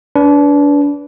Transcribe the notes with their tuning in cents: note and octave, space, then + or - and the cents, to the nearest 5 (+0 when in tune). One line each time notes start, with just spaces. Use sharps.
D4 -30 B4 +0